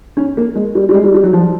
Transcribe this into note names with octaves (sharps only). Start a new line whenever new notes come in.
C#4
A#3
G#3
G3
G3
G#3
G3
G3
F#3
F3